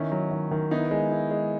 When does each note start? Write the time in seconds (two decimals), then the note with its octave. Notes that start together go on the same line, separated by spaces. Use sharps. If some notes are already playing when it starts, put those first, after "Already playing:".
Already playing: D#3 B3 C#4 E4
0.12 F#3
0.31 D#3
0.51 D#3
0.71 B3 D#4 E4
0.91 G#3
1.11 E4
1.31 G#3